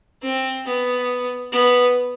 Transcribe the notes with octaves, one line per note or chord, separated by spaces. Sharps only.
C4
B3
B3